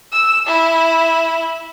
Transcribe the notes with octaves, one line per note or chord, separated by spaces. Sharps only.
E6
E4